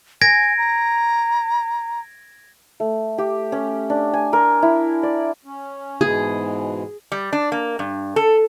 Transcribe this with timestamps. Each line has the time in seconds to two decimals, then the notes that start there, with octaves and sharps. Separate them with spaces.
0.21 G#5 G#6 A#6 D7
0.57 A#5
2.80 A3
3.18 G4
3.52 C#4
3.90 D4
4.14 G#5
4.33 A#4
4.62 E4
5.03 D5
5.45 C#4
6.01 G#2 B2 E3 G#4
7.12 G3
7.33 D4
7.52 A#3
7.79 G2
8.16 A4